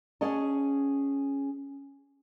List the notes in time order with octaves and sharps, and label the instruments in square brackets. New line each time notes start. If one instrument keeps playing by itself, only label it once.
[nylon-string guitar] C#4 G#4 D#5 F#5 A5